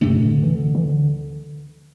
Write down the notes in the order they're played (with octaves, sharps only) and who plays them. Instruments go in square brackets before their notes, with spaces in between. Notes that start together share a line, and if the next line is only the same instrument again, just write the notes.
[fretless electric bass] D2 C3 A3 D4 [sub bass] G2
[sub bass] A2
D3
E3
D3
E3
D3